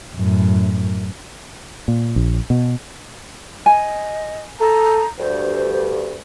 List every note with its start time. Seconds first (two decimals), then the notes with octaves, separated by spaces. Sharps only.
0.15 F#2 A2
1.88 A#2
2.16 A#1
2.50 B2
3.66 D#5 G#5
4.60 A4 A#5
5.18 D2 G2 C5